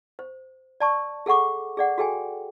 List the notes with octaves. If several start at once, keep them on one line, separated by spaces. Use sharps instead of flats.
C5
D5 A5 C#6
G#4 A4 F#5 C#6 D6
G#4 D5 F#5
F#4 G#4 A4 G5 G#5